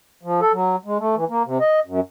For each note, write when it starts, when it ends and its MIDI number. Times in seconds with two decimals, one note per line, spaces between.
0.23 0.40 53
0.41 0.52 69
0.53 0.76 54
0.85 0.98 56
0.99 1.15 57
1.15 1.24 52
1.29 1.43 58
1.46 1.58 48
1.60 1.80 75
1.86 2.00 42